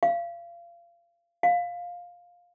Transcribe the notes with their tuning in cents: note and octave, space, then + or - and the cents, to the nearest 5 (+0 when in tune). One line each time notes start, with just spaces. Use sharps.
F5 -30
F5 +10